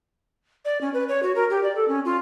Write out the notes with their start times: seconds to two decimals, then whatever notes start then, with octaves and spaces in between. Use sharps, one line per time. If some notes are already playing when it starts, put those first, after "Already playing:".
0.65 D5
0.81 C#4
0.93 B4
1.08 C#5
1.22 F#4
1.35 A#4
1.50 G4
1.63 D5
1.75 A4
1.88 C#4
2.05 F4